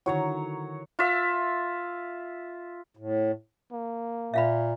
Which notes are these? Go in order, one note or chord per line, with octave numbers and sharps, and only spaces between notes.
D3 D#3 F#3 E4 C#5 A#5
F4 E5
A2
A#3
A#2 E5 F5 B5